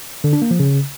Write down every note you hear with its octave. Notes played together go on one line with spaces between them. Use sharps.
D3
D4
A#3
F3
C#3